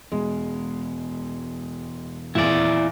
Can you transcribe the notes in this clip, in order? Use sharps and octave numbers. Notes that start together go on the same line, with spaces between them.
E2 B2 G#3
D#1 G#1 E2 A#2 E4 D5